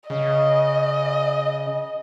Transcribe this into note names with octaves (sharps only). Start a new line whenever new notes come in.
C#3 D#5